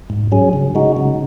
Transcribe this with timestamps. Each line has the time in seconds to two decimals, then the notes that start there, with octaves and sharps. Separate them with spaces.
0.10 G#2
0.32 F#3 C#4 G#4
0.53 C#3
0.75 G#3 D#4 F#4
0.97 C#3